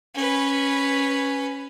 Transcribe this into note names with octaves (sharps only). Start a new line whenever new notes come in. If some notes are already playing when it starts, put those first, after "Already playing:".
C#4 B4